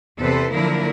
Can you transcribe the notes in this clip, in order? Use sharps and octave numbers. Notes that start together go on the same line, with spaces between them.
E2 C3 A4 B4 C5
D3 F3 F#3 A#3 E4 A#4